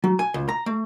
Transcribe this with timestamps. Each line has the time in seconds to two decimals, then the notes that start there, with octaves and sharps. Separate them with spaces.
0.04 F#3
0.19 G#5
0.34 C#2
0.49 A#5
0.66 A3